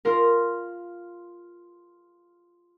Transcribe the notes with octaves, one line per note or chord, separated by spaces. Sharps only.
F4 A#4